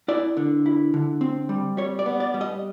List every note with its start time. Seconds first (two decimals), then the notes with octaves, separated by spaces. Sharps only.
0.08 E4 D5
0.37 D3
0.66 E4
0.94 D3
1.21 C4
1.49 G3
1.77 G3 C#5
1.99 D5
2.06 B3
2.20 D5
2.34 G3
2.41 D#5